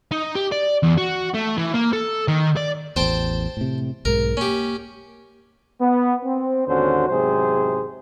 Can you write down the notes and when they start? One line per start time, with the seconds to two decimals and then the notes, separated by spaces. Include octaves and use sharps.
0.11 D#4
0.35 G4
0.52 D5
0.83 E2
0.98 F#4
1.34 A3
1.58 E3
1.74 A#3
1.93 A4
2.28 D#3
2.57 D5
2.96 A1 E2 C5 G5 A5
3.57 A2 C3
4.05 B1 G#2 A#4
4.37 A#3 C#4 G4
5.81 B3
6.24 C4
6.67 G#1 D#2 D3 C#4 F#4 C5
7.09 E2 G#2 C3 F#3 G#4 C5